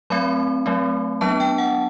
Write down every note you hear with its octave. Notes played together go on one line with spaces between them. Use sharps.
F#3 A3 C4 B5
F#3 A3 C4
F#3 B3 D4 A5
G5
F#5